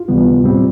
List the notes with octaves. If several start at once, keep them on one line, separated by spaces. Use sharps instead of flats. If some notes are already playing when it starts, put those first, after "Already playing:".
Already playing: F4
D2 C3 E3 G3 B3
A2 G3 C4